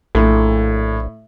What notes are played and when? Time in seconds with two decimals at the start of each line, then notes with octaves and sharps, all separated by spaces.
0.15 A#1 A2